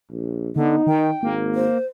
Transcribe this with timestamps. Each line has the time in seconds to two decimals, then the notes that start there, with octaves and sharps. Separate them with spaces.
0.11 A#1
0.56 D3 B3 D#4
0.87 D#3 G5
1.23 G#1 A#3
1.55 C5